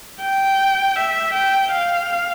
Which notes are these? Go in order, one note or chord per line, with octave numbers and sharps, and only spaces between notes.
G5
E5
G5
F5